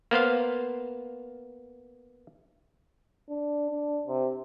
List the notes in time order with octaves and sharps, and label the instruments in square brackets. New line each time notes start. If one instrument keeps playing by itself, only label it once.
[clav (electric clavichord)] A#3 B3 C5 F5
[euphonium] D4
D4
C3